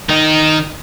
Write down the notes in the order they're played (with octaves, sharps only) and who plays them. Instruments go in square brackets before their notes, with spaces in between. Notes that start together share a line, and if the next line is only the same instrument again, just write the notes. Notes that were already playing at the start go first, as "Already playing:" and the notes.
[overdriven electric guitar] D#3 D#4